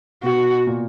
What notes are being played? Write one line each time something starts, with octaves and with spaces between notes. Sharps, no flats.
B2 B3 F#4
A#2 A#3